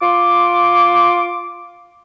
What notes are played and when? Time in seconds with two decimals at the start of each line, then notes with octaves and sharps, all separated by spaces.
0.02 F4 C6 D6